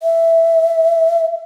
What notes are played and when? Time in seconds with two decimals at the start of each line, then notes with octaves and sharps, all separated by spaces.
0.03 E5